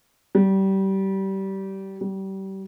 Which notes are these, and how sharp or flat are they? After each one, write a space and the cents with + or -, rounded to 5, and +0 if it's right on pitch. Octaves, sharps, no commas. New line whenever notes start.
G3 -25
G3 -30